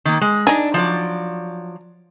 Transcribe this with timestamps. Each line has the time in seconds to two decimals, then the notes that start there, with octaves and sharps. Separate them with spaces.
0.05 D#3 A#3
0.21 G#3
0.47 D4 D#4 G#4
0.74 F3 F#3 D5